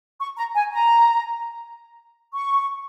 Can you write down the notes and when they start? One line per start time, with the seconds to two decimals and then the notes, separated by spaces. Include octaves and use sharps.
0.20 C#6
0.38 A#5
0.56 G#5
0.73 A#5
2.34 C#6